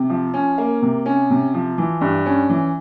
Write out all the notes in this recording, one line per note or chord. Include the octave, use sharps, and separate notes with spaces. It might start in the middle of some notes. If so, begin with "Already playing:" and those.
Already playing: C3
F3
C#4
A#3
C3
C#4
C3
F3
E3
G2
C#4
E3